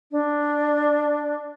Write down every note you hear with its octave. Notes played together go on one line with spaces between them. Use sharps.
D4